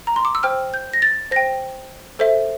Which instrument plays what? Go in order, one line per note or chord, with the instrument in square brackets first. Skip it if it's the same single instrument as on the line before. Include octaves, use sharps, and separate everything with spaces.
[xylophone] A#5
C6
D6
E6
C5 G5 F6
G6
A#6
A6
C5 G5 A#6
A4 C5 E5